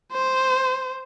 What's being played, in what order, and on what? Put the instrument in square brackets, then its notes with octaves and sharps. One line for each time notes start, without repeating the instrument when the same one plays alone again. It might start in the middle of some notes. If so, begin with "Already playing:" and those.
[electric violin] C5